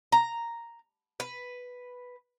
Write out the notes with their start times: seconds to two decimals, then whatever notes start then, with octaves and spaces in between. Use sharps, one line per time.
0.12 A#5
1.20 B4